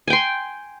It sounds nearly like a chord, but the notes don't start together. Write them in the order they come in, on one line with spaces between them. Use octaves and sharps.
G#5 G5 C6